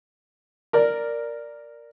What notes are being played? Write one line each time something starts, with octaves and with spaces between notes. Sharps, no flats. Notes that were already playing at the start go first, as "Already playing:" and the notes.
A#4 D5